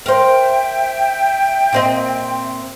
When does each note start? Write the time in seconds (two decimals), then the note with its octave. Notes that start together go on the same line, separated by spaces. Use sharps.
0.06 A#4 C5 E5 G5
1.72 A#2 C4 D#5